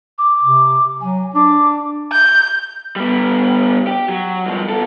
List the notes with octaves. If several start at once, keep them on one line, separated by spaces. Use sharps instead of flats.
D6
C3
F#3 G#5
D4 D6
G6
G3 B3
G4
F#3
G2 F3
B3 A4